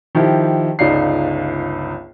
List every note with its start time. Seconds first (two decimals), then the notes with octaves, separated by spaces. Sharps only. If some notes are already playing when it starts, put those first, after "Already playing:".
0.15 D#3 F3 E4 G4
0.79 G1 C#2 D#4 D5 F5 C7